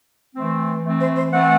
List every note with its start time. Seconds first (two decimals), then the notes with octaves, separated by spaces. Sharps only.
0.34 E3 A3 C4
0.84 E3 A3 C4
1.00 C5
1.16 C5
1.33 E3 A3 C4 F#5